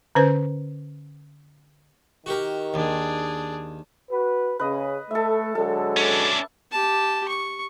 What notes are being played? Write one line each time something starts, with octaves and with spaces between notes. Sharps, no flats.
D3 C#4 B4 C5
D#3 F#4 G4 A#4
D#2 D4 G#4
F#4 B4
C#3 B4 D#5
A3 A4 E5
D3 F#3 G#3 A4
C#4 D4
G4 A5
C#6